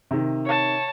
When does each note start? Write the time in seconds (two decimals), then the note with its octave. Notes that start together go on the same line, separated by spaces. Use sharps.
0.11 C3 D#3
0.46 C#5 A5